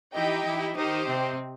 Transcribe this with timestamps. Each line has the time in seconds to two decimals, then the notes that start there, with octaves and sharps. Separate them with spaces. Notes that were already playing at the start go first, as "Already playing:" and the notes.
0.14 E3 D#4 E4 G4 D#5 G5
0.45 E3 E4
0.76 D#3 D#4 G4 C5 D#5
1.07 C3 C4